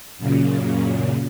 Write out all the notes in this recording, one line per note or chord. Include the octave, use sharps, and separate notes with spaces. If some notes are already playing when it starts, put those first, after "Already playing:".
F#2 A#2 C#3